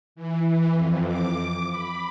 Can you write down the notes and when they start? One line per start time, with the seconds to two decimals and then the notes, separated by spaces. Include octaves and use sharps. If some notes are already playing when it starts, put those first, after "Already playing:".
0.15 E3
0.71 F2
1.07 D6
1.71 B5